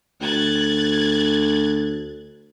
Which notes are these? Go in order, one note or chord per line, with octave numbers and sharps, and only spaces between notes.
D2 F#6 G#6 A6